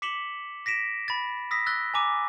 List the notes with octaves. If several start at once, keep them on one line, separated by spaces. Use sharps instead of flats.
D6 B6 C#7 E7 F#7 G7
A#6 B6 D7 E7
B5 A6
D#6 E6 A#6 B6
E6 F#6 A6 A#6 G7
G#5 A#5 D6 D#7